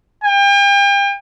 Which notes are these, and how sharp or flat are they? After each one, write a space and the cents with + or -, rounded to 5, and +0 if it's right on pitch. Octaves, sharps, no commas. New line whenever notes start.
G5 +40